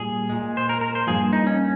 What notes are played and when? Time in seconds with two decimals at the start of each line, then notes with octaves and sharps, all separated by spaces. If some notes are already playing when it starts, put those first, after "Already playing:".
Already playing: A#2 G3 G#4
0.29 A#2 G#3
0.57 C5
0.69 A#4
0.81 A#4
0.95 C5
1.07 G2 F3 A#3 G#4
1.33 D#4
1.47 C#4